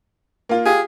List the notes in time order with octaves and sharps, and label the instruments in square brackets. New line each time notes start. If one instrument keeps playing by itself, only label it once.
[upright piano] A#3 F4
[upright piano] F4 G4 [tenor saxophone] G#4